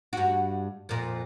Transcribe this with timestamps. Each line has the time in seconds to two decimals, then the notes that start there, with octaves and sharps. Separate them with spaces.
0.13 G2 F#4
0.89 F2 A#2